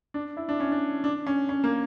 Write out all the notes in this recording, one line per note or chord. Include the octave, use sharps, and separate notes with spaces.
D4
E4
D4
C#4
D4
D4
C#4
C#4
A#3